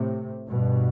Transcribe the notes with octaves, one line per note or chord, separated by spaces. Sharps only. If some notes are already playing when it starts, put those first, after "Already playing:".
Already playing: A2 C3
G2 B2